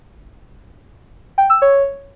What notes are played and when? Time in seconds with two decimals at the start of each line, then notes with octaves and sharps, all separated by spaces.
1.38 G5
1.50 E6
1.62 C#5